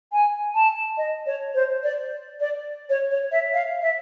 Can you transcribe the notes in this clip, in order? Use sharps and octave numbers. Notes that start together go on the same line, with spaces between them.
G#5
A5
D#5
C#5
C5
D5
D5
C#5
C#5
E5
F5
E5